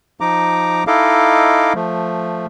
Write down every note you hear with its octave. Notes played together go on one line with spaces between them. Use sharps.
F3 D#4 A#5 D6
D#4 E4 A4 D#5 F5 D6
F3 A3